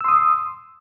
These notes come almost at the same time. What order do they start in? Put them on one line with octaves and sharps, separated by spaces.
E6 C6 D#6